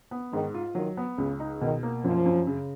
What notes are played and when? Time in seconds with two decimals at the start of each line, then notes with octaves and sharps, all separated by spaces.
0.11 B3
0.33 G#2 D#3
0.54 F4
0.75 D#3 F#3
0.97 B3
1.18 C#2 C#3
1.40 D#4
1.61 B2 D#3
1.83 A#3
2.04 F#2 F3
2.26 F#2
2.47 C#3